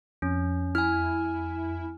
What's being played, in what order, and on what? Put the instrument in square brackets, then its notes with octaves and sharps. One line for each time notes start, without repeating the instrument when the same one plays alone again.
[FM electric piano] F2 [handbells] C#4
[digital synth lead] E4 [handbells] G#5 F6